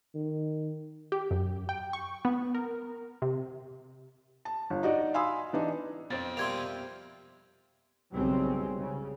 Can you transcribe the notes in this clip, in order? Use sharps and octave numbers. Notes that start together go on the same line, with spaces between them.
D#3
G4
F#2
G5
C#6
B3
A#4
C3
A5
G1
D#4 F#4 D5 D#5
F5 G#5 B5 C6 D#6 E6
E3 D4 D#4
F2 B2 C4 G5 A6
C3 G3 A#3 C6 G#6 F7
B1 C#3 G3 G#3 C4 C#4
C#3